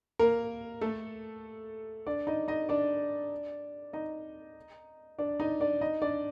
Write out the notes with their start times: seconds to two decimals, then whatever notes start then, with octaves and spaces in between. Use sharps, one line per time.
0.19 A#3 A#4
0.81 A3 A4
2.07 D4 D5
2.27 D#4 D#5
2.48 D#4 D#5
2.69 D4 D5
3.93 D#4 D#5
5.19 D4 D5
5.40 D#4 D#5
5.60 D4 D5
5.81 D#4 D#5
6.02 D4 D5